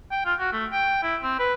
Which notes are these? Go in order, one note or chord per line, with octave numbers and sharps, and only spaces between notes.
G5
F4
F#4
A3
G5
E4
C4
B4